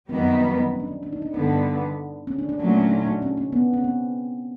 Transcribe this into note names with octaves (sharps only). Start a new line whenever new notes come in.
F#2 D#3 G3 B3 C4
C#4
D4
C#4
D4
D#4
D4
G2 D3 G3 B3 D#4
D4
C#4
D4
D4
A#2 F#3 A3 C#4 D4
D4
D#4
D4
C#4
C#4
B3
C#4
C4